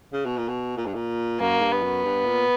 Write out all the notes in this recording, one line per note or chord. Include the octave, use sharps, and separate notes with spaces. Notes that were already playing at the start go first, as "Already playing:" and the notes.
C#3
B2
A#2
B2
A#2
G2
A#2
F#2 A#3
G2
B3
F#2
G2
A#2